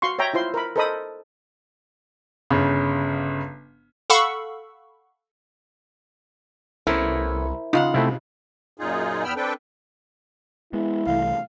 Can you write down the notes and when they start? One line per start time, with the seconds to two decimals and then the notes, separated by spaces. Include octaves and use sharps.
0.02 F#4 F5 C6 C#6
0.19 C#5 E5 G5 A#5
0.34 E4 F4 C5 C6
0.54 A#4 B5
0.76 A4 A#4 C5 D#5 B5 D#6
2.50 G1 C#3
4.10 A4 F5 F#5 B5 C#6 E6
6.87 C2 A3 B3 C#4 E4 A#4 C5
7.73 C#3 D#4 F4 F5 F#5
7.94 C3 A3 C4 E4
8.78 F#2 A#2 D#4 F4 G#4
9.24 E2 B3 G5 B5 E6 F6
9.36 C4 D4 A4 B4 G5
10.73 G#3 B3 E4
11.07 C2 E3 A3 F5